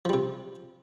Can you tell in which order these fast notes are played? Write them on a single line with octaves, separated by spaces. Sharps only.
F3 G3 C3